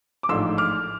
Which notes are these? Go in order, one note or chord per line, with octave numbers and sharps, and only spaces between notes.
D6
A1 G#2 F3 A3 D4 C6 E6
D6 F6